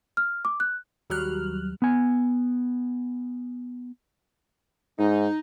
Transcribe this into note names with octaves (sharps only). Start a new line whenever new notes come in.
F6
D6
F#6
D#2 F#3 G3 F6 F#6
B3 G#5
G#2 D#4